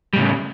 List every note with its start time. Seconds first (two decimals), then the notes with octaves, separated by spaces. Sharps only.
0.13 G3
0.16 A2
0.18 C#3